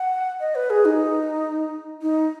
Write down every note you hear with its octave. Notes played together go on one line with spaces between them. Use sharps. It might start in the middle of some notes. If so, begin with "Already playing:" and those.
Already playing: F#5
D#5
B4
G#4
D#4
D#4